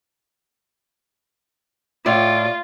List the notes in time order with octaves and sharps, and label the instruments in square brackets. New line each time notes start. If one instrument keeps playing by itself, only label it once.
[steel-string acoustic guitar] A2 D5 [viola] F4